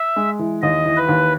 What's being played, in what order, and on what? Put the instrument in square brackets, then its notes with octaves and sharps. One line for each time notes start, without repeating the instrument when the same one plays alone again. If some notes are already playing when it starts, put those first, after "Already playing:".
Already playing: [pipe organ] E5
[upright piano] G#3
E3
[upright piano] D#2 [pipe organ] D#5
[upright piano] E3
[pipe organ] B4
[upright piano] D#2